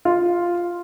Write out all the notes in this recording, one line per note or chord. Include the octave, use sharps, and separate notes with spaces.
F4